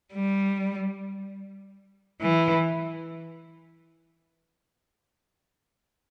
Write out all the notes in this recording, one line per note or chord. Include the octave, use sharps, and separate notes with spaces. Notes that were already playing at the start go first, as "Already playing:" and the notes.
G3
E3